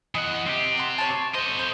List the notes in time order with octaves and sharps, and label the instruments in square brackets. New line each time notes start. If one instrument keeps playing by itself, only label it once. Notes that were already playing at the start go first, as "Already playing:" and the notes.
[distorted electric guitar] E3 F#5 [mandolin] D#5
[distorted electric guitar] C4 G4
[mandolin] F#5 C6
C#5 A5
[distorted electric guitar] A4 D#5 [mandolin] C5
[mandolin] C5